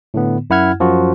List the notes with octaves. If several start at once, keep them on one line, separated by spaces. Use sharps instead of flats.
A2 D3 B3
F#2 E4 F#5 F6 G#6
F#2 F3 F4 F#4